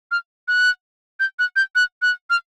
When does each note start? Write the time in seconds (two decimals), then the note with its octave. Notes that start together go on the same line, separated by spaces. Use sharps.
0.11 F6
0.48 F#6
1.20 G6
1.39 F#6
1.56 G6
1.75 F#6
2.02 F#6
2.30 F6